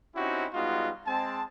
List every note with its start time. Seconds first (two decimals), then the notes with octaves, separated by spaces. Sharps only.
0.15 C4 C#4 D#4 E4 F#4 G4
0.53 G3 G#3 B3 D#4 F4 F#4
1.06 G#3 C4 A5